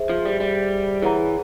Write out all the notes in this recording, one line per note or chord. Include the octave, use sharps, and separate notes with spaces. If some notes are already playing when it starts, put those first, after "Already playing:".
Already playing: G#4 C5 E5
F3
G3
G3
E3 G#4 C#5 F#5 A#5